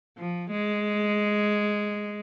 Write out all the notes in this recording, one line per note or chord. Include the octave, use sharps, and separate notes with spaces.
F3
G#3